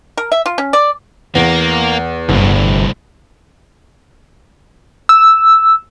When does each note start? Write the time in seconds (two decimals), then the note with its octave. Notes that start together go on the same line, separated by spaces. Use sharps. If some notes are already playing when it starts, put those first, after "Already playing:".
0.17 A#4
0.32 E5
0.46 F4
0.58 C#4
0.73 D5
1.35 E2 A#3
2.29 G1 C2 A2
5.09 E6